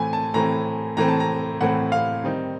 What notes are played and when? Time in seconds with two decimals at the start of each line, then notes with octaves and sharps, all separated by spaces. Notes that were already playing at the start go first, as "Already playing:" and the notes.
Already playing: A2 E3 A3 C4 G#5
0.13 A5
0.34 A2 E3 A3 C4 A#5
0.97 A2 E3 A3 C4 A#5
1.08 A5
1.20 A#5
1.61 A2 E3 A3 C4 F#5
1.92 F5
2.24 D#3 G3 C4 D#4